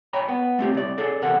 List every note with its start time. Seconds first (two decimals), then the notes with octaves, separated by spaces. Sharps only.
0.13 C#5 G5 A#5 B5
0.29 B3
0.59 A3 C4 G4
0.74 C2 D5
0.98 G#4 A4 D5
1.22 E2 C3 A4 A#4 F#5